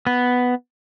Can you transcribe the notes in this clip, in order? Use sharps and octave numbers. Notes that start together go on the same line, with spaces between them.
B3